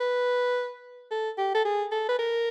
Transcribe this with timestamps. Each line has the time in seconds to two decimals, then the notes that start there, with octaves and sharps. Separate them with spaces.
0.01 B4
1.11 A4
1.38 G4
1.55 A4
1.65 G#4
1.92 A4
2.09 B4
2.19 A#4